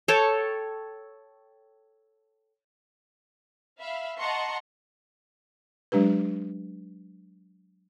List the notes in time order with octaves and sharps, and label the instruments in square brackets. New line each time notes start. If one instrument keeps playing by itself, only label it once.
[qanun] A4 C#5 G5 A5
[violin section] E5 F5 B5
D#5 F#5 A5 A#5 C6 C#6
[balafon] F#3 G#3 D4 G4 B4